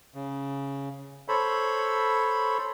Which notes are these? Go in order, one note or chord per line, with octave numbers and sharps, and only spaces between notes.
C#3
A4 C5 C#5 B5